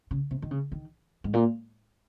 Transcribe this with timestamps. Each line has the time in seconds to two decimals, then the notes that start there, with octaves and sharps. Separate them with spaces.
0.11 C#3
0.31 C3
0.42 D#3
0.51 C#3
0.72 D#3
1.24 G#2
1.33 A#2